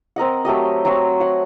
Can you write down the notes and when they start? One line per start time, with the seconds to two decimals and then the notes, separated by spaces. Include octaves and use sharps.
0.16 C4 A#4 D#5 F#5
0.45 F#3 A3 G4 D#5
0.85 F#3 C4 F#4
1.20 C#5 F#5 C6